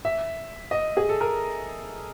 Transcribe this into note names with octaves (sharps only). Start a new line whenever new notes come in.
E5
D#5
G#4
A4
A#4